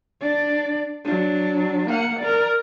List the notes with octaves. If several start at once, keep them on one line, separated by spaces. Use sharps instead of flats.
D4 D5
F#3 D4
A#3 F#5
A#4 D5